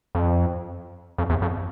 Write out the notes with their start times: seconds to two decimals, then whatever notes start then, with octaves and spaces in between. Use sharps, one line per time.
0.15 F2
1.18 F2
1.30 E2
1.42 F2